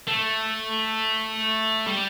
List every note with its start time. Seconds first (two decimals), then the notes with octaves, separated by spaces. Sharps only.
0.07 A3
1.86 G3